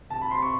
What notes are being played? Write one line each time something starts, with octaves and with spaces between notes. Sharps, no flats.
C2 A5
B5
C3 C6
C#6